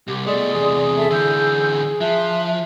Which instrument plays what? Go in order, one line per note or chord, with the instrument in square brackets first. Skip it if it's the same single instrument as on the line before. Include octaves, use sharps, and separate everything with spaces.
[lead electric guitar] C2 [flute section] G4
[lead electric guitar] B2 A3 [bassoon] G#3 [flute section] D5 C6 D#6
[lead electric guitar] E2 C3 [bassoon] G#4
[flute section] A4 E5 A5
[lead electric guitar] D3 E3 [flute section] E6 G6
[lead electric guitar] F3 [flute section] E5 A5 F#6